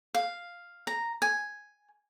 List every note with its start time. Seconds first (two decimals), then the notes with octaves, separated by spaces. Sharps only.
0.15 F5
0.87 A#5
1.22 G#5